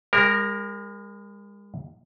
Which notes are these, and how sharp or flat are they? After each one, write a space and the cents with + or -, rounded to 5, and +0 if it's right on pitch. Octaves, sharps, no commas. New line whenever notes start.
G#3 -45 A#4 +0